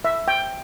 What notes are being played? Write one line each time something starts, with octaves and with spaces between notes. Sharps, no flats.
E5
G5